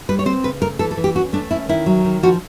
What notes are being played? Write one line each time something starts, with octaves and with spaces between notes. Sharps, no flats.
G3 B4
C#5
C4 C5
C#3 B4
A3 A#4
E3 A4
A4
E3
G4
C#4 F#4
A3 D4
C#4 E4
D#3 E4
F#3
D#3
F3 F#4